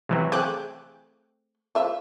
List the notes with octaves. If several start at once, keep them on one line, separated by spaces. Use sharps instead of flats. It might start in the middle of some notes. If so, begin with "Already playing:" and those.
C3 E3 F#3
A3 C4 G#4 D6 F#6 G6
F3 E5